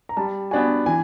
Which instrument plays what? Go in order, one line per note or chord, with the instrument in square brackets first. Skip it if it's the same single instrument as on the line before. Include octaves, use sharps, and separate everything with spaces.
[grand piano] A#5
[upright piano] G3 [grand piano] A5
[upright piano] B3 D4 F#4 [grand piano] G#5
[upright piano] E3 [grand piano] G#5